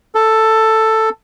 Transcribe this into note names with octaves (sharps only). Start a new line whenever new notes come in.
A4